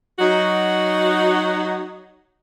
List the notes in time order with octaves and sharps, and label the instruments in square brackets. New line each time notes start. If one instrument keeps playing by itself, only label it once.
[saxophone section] F#3 D#4 F#4